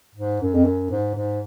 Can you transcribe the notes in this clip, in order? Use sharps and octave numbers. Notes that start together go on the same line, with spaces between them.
G#2
F#2
F2
F#2
G#2
G#2